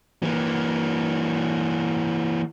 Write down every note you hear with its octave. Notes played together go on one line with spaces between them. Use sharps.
E3 A#3